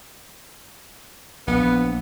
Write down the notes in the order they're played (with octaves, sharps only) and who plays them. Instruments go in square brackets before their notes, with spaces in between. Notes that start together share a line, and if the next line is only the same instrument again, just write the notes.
[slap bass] A#1 [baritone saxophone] B3